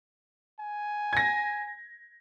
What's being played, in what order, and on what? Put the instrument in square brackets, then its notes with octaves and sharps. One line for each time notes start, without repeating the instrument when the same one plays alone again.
[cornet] G#5
[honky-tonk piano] G#6 A#6